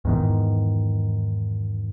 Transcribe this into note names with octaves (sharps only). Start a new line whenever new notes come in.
E2 G#2 D#3